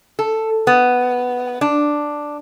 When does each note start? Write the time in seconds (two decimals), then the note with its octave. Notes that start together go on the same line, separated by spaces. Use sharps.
0.19 A4
0.67 B3
1.61 D4